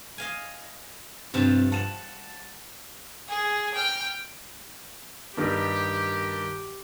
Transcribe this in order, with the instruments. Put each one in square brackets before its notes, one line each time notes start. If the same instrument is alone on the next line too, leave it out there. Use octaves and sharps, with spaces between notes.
[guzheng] D#5 F5 G#5
[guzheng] G2 F3 A5 [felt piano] C3
[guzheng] F#5 [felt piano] A5 E7
[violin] G#4
G5 F6
[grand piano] G2 D#3 G3 [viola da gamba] G4